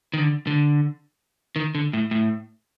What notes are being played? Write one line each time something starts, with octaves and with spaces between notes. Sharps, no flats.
D#3
D3
D3
D#3
D3
A2
A2